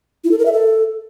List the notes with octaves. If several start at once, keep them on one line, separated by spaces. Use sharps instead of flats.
E4
A4
A#4
E5
A4